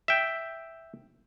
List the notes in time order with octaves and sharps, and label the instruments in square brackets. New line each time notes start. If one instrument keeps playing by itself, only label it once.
[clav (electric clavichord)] E5 G5